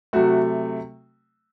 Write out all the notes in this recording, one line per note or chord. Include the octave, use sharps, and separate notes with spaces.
C3 F#3 A3 F#4